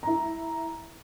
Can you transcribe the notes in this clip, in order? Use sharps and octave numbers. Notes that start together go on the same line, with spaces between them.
E4 A#5